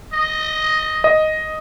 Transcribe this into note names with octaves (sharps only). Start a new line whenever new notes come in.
D#5
D#5